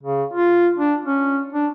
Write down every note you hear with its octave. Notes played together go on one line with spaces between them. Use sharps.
C#3
F4
D4
C#4
D4